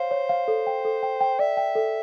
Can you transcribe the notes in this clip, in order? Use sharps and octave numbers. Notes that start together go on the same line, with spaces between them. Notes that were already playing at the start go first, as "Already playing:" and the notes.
Already playing: C5 C#5 F5
C#5
F5
A4
G5
A4
G5
G5
D5 E5
G5
A4